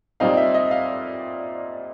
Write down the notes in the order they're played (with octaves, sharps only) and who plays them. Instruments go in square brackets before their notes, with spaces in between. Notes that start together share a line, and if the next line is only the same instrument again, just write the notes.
[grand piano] A#2 G3 C4 D#4 F5
E5
D#5
F5